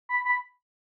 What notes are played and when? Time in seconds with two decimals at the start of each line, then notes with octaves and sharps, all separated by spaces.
0.10 B5
0.25 B5